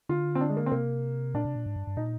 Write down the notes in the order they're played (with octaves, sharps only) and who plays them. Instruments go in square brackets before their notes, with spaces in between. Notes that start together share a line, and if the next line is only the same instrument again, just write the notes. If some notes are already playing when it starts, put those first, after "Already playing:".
[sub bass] D3 [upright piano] F4
[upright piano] C4
D4
G#3
A#3
C4
[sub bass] C3 [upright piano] A#3
[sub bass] A#2 [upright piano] D4
[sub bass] C3
A#2
G#2
G2
G2
[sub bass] A#2 [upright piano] D#4